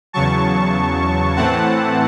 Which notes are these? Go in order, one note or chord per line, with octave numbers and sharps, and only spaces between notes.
E2 C#3 F#3 A5 C#6
A2 E3 A3 C4 F#5 A5